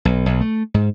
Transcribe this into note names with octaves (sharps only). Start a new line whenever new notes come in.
B1
B1
A3
G#2